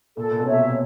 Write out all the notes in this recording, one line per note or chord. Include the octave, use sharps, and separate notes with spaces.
A#2 A4
A#2
B2
C3 C#5 E5
C3